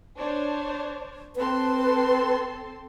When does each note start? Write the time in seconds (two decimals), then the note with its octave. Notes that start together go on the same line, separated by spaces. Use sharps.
0.16 D4 C5 C#5
1.36 C4 A4 B4 C6